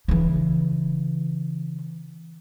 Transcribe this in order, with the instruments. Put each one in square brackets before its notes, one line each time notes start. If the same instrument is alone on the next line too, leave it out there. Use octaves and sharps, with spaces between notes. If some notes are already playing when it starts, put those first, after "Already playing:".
[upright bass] C#3 E3